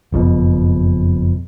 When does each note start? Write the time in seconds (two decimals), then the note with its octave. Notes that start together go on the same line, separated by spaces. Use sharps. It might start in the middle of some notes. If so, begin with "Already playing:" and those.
0.12 F#1 F2 G#2 B2